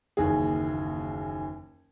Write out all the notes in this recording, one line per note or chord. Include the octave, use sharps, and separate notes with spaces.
F#1 D#2 E3 G#4